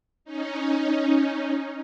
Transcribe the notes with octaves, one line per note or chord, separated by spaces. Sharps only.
C#4 D#4